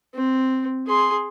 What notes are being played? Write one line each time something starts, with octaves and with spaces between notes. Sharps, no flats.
C4
G#4 C6